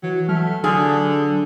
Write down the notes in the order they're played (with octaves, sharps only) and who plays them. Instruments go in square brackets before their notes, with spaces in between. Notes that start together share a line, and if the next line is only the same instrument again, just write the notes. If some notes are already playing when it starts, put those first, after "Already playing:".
[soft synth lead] E3 [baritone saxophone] F#3
[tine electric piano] F#3 [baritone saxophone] A3 [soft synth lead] F6
[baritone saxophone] D3 [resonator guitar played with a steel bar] G#4 [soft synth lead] A5